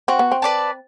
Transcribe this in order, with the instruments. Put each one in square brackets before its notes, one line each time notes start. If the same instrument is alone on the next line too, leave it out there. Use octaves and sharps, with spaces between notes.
[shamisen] C4 [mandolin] F#4
[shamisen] B3
C4
[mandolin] B4 D5 A5